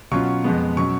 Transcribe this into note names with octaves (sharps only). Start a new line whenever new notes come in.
B2 F#3 C#4 F4 C#6
F2 F3 G#3 B3
B2 F#3 C#4 C#6